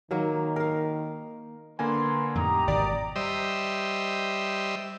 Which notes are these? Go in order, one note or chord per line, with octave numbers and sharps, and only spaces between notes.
D#3 F#3 A#3
A#4 F5
D3 A#3 B4 G#5 A#5 C6
F2 A2 D#4 G4 A#5 D#6
G#1 B2 D#3 D5
G3 C5 D#5 E5